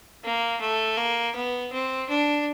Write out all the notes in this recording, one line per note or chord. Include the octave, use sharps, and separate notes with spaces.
A#3
A3
A#3
B3
C4
D4